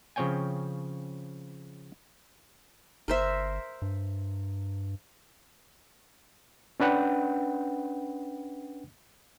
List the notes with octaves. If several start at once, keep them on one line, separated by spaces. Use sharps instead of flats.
C#3 F3 C4 C#5 G5 G#5
G1 A#4 C5 E5
G2
C#4 D4 B4 F#5 G5